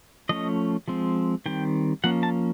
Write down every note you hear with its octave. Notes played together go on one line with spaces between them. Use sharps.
F3 A3 C#4 D#5
F3 G#3 C4
D#3 G3 C4 G5
F3 A#3 C#4 F#5
A5